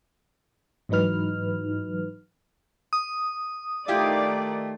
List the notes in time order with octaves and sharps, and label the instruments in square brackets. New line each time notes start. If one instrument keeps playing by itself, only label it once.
[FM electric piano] G#2 E3 F#3 D#4 B4 F6
[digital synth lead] D#6
[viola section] D#3 D5 [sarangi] A3 [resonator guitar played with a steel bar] E4 F4 G4